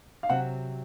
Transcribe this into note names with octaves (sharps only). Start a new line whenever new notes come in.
F5
C3 F#3 C4 F#5